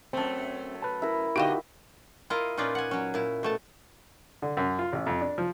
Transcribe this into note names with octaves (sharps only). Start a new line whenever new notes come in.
F#2 A3 C4 A5
B4 A5
E4 A#4
B2 D3 D#4 F#4 G4 D#5 F5 G5
E4 F4 A#4 D#5 F5
A#2 C#4 D#4 F4 B4 D5
F#5 G#5
F#3 C#4
A#2 E4
B2 A3 A5
D3
F#2
F4
A1
F2
D4
F3